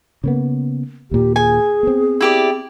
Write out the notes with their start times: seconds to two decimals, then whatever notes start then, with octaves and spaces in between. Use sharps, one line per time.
0.24 C#3 A#3 B3
1.11 D#2 A#2 G4
1.36 G#4 G#5
1.83 B3 C4
2.21 E4 G4 D5